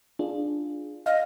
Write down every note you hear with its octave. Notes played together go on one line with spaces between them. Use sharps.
D4 F4 G#4
D#5 F5 F6